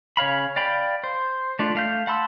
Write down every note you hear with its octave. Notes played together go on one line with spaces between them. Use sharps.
C#3 C#5 F5 B5
D5 F5 G5 B5
C5
A3 D4 F4
A3 F5 G6
F#5 A5 B5 C6 E6